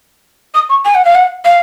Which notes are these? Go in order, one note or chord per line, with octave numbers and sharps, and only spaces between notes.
D#6
C#6
G#5
F#5
F5
F#5
F5